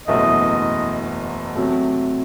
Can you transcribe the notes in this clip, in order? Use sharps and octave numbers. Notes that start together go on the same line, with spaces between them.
F#1 E2 B2 A3 E4 D#5
C3 F#3 A3